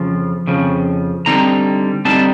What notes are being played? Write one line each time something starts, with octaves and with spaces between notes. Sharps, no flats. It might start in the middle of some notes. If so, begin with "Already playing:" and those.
Already playing: F2 C#3 F3
F2 C#3 F3
D3 G3 C4 D#4 A#5
D3 G3 C4 D#4 A5